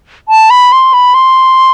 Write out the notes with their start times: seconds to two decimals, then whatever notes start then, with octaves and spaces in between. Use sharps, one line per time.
0.29 A5
0.50 B5
0.72 C6
0.93 B5
1.14 C6